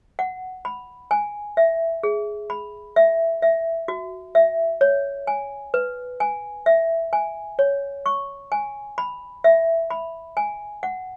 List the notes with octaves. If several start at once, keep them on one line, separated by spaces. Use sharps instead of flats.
F#5
B5
G#5
E5
G#4
B5
E5
E5
F#4
E5
C#5
G#5
B4
G#5
E5
G#5
C#5
C#6
G#5
B5
E5
B5
G#5
F#5